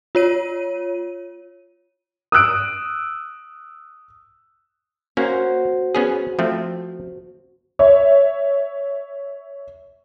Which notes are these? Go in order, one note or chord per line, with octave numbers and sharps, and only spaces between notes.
F4 C#5 D#7
D#6 E6 F#6 D7
A#3 C#4 F#4 C5
B3 C#4 G#4
F3 A3 C4
C#5 E5